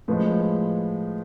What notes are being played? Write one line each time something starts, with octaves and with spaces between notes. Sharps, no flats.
A2 F3 G#3 B4